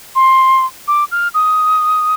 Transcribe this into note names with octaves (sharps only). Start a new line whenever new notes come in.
C6
D6
F6
D#6